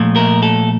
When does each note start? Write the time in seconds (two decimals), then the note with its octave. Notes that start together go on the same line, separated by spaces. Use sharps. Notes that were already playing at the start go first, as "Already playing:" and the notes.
Already playing: A#2 F3 A3
0.16 A#4
0.43 A4